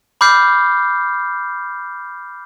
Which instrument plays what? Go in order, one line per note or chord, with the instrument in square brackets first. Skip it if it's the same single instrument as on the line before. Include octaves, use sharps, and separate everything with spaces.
[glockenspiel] B5 D6 F6 G6 C7